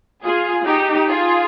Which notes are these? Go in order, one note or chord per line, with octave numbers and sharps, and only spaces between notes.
F4 G#4
D#4 G4
F4 G#4